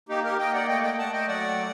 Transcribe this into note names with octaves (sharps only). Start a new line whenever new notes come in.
A#3 D#4 G4
G4 A#4
A#3 D#5 G5
D5 F#5
A3 D#5 G5
D#5 G5
A3 F#5 A5
D#5 G5
F#3 D5 F#5